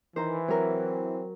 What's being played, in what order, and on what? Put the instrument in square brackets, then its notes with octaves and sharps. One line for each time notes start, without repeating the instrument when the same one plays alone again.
[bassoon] D#3 [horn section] E3 [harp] C5 A#5
[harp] F#3 A#4 [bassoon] C4